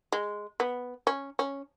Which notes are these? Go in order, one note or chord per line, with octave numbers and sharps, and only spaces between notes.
G#3
B3
C#4
C#4